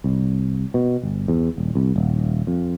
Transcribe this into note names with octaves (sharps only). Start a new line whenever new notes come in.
C2
B2
G1
E2
D#1
C2
D#1
F2